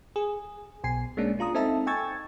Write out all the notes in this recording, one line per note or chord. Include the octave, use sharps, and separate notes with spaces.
G#4
B1 B2 G#5 C7
G#3 A#3 C#4 D4
D4 F4 A#5 D#6
C4 D#4 A4 D#5 E5 A5
G5 G#5 C#6 E6 G#6 A6